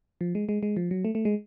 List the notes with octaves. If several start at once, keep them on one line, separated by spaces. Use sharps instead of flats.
F3
G#3
G#3
G#3
F3
F#3
A3
A3
G#3